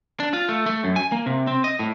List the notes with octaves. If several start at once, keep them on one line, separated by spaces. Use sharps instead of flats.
D4
F4
A3
A3
F#2
G#5
A#3
C3
C4
D#5
A2